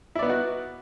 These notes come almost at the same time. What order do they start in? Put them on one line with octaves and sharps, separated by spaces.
E4 D5 B3 D#4 F#4